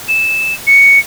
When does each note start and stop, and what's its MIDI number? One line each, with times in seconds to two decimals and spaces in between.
0.08 0.54 100
0.67 0.99 97